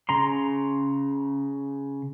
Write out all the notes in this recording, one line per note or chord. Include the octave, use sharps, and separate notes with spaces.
C#3 A#5 C6